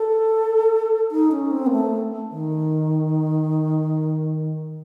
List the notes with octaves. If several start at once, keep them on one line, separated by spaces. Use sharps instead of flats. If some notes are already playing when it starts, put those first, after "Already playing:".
Already playing: A4
D#4
C#4
C4
A#3
A3
D#3